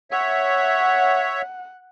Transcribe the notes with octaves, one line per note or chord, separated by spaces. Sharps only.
C#5 E5 F#5